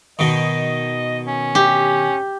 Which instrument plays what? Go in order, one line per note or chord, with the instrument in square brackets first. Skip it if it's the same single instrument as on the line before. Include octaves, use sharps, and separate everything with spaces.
[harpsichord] B2 D#3 [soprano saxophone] D#5
[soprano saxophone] C#4
[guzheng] G4